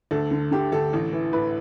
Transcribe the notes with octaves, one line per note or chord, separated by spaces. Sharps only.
D2 A4
D3
D3 G4
D2 A4
A1
E3
A2 B4